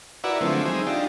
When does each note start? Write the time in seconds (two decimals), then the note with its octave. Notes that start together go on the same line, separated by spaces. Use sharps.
0.24 E4 F#4 A#4 B4 D5 E5
0.41 D3 F3 F#3 G#3 A3 C4
0.65 C4 D#4 G#4 E5
0.86 D4 D#4 F4 G4